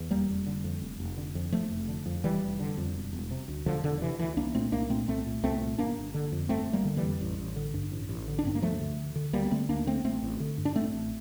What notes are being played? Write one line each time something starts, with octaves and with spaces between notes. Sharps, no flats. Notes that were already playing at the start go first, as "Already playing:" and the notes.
Already playing: E2
F1 G3 A#3
F1
D3
F2
F1
F1
D3
F2
F1 F3 A3
F1
D3
F2
F1 E3 G3
F1
D3
F2
E1
E1
C3
D2
E1 D3 F3
E1 D3
C3 E3
D2 E3
C2 A#3 D4
A#2 A3 C4
C2 A#3 D4
A#2 A3 C4
C2 A3 C4
A#2
C2 A3 C4
A#2
G1 A#3 D4
G1
D3
F2
G1 A3 C4
G1
G3 A#3
D3
E3 G3
F2
A1
A1
D3
G2
A1
A1
D3
D4
G2 C4
A#3
D2 F3 A3
D3
D2
D3
D2 G3 A#3
A#3
D3 A3 C4
D2 A#3 D4
D3 A3 C4
A1 A3 C4
A1
D3
G2
D4
A1 A3 C4
A1